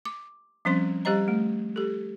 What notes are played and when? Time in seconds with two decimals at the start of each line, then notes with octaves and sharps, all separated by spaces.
0.05 D6
0.65 F3 G3 C4 C#4 C5 C6
1.05 G3 G4 C5 D#5 A#5
1.28 A3
1.76 G4 A4